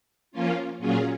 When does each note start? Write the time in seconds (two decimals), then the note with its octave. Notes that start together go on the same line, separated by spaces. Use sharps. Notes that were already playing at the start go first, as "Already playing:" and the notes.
0.31 F3 A#3 C#4 F4
0.79 A#2 F#3 C#4 F4 G#4